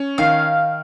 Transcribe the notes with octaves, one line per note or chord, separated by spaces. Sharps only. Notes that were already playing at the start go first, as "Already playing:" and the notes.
Already playing: C#4
D#3 F5